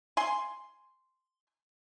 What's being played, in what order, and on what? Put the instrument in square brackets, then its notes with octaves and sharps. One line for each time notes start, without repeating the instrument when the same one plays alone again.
[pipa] G#5 C6